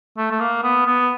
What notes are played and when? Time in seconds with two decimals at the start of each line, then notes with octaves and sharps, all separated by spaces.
0.17 A3
0.31 A3
0.40 A#3
0.63 B3
0.86 B3